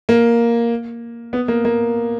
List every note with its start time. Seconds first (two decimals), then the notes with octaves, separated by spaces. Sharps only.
0.09 A#3
1.33 B3
1.48 A#3
1.65 A#3